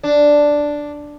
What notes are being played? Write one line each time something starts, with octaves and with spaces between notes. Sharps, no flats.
D4